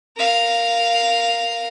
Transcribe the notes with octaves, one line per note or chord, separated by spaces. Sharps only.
A#4 F5